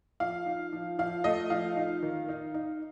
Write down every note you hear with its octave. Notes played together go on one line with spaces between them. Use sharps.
F3 F5
D#4
F3
F3 F5
A3 D#5
F3 F5
D#4
D#3
D#4
D#4